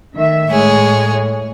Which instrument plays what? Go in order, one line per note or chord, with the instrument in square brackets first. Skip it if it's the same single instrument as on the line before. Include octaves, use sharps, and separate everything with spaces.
[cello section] D#3 A3 E5
[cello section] A2 [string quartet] G#3 G#4 C#5